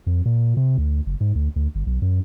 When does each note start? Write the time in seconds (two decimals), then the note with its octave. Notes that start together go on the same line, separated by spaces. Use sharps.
0.07 F2
0.25 A#2
0.57 C3
0.78 D2
1.06 F#1
1.20 G#2
1.35 D2
1.56 D2
1.75 G1
1.87 B1
2.02 F#2